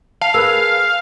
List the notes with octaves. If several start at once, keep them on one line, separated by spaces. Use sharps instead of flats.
F5 A5
G#4 A#4 B4 E6 F#6